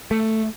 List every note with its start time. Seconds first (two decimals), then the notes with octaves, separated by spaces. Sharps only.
0.11 A3